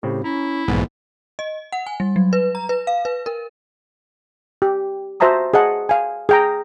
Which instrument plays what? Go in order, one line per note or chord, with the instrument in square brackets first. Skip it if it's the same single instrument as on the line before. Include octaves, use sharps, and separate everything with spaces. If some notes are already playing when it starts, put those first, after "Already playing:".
[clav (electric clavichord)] A2 C#3 C4 [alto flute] G4
[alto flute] C#4 [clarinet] E4 [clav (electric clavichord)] A#5
[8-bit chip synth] B1 G#2 [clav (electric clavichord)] E2 B3 [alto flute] A#3
[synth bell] D#5
F#5
G#5
G3
F#3
B4
A#5
B4
F5
B4
A#4
[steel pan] G4
F#4 C5 E5 A5 A#5 D#6
G#4 D#5 F#5 A5
F5 G#5
G#4 G5 A#5